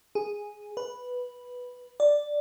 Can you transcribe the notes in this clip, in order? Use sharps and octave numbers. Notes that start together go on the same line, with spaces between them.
G#4
B4
D5